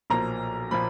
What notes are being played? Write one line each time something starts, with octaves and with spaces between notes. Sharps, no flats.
B1 A#2 F3 A#3 A#5
A#2 F3 A#3 B5